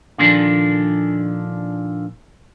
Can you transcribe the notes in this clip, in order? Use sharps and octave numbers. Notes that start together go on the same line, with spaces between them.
A#2 D3 D#3 F3 D4